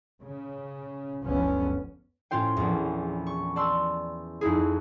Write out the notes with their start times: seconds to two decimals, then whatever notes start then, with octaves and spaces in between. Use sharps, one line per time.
0.21 C#3
1.22 F#1 C#2 D3 F3 B3 C#4
2.31 A2 C#4 F4 C5 G5
2.57 A#1 E2
3.27 C#6
3.56 D5 A5 C6 E6
4.41 F2 D#4 E4 G#4